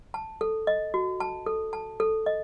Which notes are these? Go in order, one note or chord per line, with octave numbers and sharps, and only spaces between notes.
A5
A4
D#5
F#4
A5
A4
A5
A4
D#5